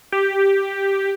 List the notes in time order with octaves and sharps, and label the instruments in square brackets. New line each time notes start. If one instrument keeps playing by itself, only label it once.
[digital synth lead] G4